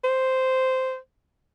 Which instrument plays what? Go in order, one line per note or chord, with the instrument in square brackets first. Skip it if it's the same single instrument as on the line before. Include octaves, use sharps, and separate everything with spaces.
[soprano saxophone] C5